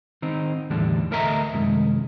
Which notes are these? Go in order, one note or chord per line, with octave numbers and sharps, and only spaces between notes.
D#3 C4 D#4
E2 A2 D3 E3 G3 D4
D2 A3 A#4 D#5 E5 A#5
C2 F#2 D#3 G#3